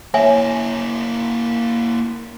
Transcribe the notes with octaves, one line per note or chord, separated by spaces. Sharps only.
A#3 E4 C#5 E5 G#5